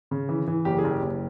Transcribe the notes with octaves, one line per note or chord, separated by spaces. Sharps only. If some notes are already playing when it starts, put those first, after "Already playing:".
C#3
E3
E3
F#1 G4
G#4
F#1
G4
F#1